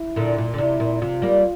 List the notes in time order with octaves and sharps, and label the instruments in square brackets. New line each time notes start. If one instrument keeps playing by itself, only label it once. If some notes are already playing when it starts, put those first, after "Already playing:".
Already playing: [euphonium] E4
[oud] A#2 D3
A#2
D3
[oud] C3 [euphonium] E4
[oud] A#2
[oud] C3 [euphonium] F4
[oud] G3 A#3